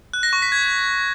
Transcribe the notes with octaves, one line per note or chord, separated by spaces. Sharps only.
F#6
A#6
C#6
B6
G#6